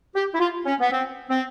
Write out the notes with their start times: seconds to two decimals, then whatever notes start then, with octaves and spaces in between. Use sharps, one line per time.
0.16 G4
0.35 E4
0.40 F4
0.66 C#4
0.80 B3
0.92 C4
1.30 C4